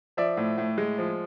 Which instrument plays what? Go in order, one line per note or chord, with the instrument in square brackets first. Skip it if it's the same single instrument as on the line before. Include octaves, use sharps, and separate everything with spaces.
[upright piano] F3 D5 E5
A2
A2
G#3
F3